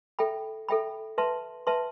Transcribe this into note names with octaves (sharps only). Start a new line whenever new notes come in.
A4 E5 G5 B5
A4 E5 G5 B5
B4 E5 A5 C6
B4 E5 A5 C6